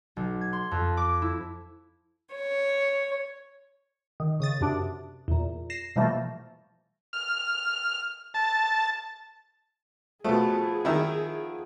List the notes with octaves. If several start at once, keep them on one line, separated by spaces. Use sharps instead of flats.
B1
G#6
C6
F2
D6
E4
C#5
D#3
C#3 D#6 A6
F#2 C3 D4
E2 A#2
A#6 C7 E7
B2 E3 F3 G3 A3 A#3
F6
A5
B2 F3 A3 B3 G#4
D#3 E4